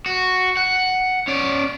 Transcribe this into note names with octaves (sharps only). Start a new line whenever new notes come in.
F#4
F#5
C#4 D5